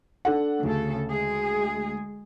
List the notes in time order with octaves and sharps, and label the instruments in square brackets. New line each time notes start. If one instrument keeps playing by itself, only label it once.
[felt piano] D4 A4 F#5
[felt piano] D2 [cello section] C#3 A4
[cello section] G#3 G#4